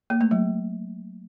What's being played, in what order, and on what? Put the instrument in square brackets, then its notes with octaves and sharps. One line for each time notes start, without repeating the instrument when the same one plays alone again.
[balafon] A#3
A3
F#3